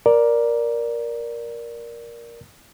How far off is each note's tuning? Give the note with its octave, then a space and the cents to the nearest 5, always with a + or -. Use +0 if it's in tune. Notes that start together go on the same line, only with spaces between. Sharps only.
A#4 +10 D5 +0